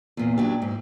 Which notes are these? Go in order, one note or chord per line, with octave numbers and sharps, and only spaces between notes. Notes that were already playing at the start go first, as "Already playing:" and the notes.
E2 A#2
D#2 F#3 D4 G4
G#2